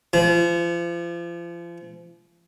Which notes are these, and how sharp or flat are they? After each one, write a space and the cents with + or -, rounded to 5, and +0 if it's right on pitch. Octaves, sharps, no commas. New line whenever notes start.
F3 -35